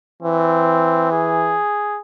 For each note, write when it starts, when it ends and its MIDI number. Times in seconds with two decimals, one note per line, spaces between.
0.23 1.59 52
0.23 1.10 60
1.12 2.00 68